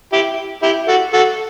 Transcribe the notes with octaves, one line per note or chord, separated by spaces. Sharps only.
E4 G4
E4 G4
F#4 A4
F#4 A4